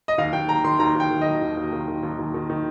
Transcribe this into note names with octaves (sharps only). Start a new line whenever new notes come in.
D#5
D#2 F5
D#2 G5
D#3 A#5
D#3 C6
D#2 A#5
D#2 G5
D#3
D#3 D#5
D#2
D#2
D#3
D#3
D#2
D#2
D#3
D#3